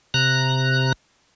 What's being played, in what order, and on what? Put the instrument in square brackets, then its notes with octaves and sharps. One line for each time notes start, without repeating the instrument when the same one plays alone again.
[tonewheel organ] C3 A#5 F#6